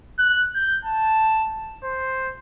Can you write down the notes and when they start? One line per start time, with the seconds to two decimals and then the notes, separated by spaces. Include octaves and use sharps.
0.19 F#6
0.55 G6
0.85 A5
1.84 C5